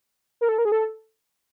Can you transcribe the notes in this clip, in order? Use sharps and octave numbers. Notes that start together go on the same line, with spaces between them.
A#4
A4
A#4
G#4
A4